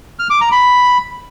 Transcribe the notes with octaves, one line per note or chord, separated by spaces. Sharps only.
F6
D6
A#5
B5